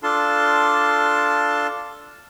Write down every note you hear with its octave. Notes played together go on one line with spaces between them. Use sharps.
D4 F4 A4 A5 C6